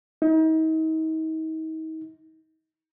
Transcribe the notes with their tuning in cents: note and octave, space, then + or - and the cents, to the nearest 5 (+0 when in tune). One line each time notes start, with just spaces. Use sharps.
D#4 +40